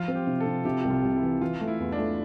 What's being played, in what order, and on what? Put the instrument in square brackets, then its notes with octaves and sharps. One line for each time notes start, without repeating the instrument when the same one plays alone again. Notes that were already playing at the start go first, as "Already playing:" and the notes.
Already playing: [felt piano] F3 [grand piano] F4
[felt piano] C4
[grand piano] G4
[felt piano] C3
[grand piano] A4
[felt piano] C3
[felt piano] C3 [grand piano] G4
[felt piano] C2 [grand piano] G4
[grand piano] F4
[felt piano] C2
[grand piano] E4
[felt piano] E3
[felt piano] E3 [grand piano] F4
[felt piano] A3
[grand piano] E4
[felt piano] E2
[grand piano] D4
[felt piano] A3